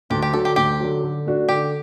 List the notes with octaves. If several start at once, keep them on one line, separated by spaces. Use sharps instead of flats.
D2 G4
G4
D3 F#3 A4
G4
D2 G4
D3 F#3
D3
A3 D4 F#4
D3 G4